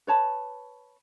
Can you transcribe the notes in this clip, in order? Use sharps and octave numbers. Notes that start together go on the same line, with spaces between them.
B4 C#5 A5 B5